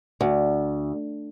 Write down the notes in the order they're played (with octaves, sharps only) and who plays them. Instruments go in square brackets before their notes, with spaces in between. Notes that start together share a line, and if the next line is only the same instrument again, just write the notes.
[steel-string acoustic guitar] D2